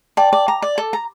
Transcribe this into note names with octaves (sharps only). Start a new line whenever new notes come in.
D5 G5 A5
D5
A#5
D5
A4
A#5